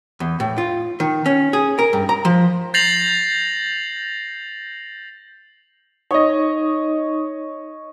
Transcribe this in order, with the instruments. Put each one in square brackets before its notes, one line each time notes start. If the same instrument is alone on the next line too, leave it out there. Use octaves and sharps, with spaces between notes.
[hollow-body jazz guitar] E2
A2
F4
D#3
C#4
G#4
A#4
G2
A#5
F3
[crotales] G6 A6 A#6 C7 F7 F#7
[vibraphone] D#4 D#6 [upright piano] C#5 D#5